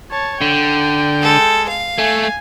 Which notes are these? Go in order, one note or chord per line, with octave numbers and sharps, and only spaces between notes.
C#5 A5
D3 G5
G#3 A4
F5
A3 G#5